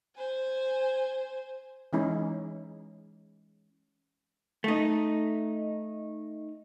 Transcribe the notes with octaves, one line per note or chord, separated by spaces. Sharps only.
C5 G#5
E3 G#3 C#4 D#4 E4
A3 D#4